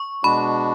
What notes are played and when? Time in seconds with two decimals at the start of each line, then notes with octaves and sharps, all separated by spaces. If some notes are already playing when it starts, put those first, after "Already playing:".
Already playing: C#6
0.24 B2 G#3 D4 F#4 B5